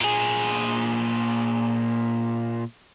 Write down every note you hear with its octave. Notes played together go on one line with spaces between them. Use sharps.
A#2 G#4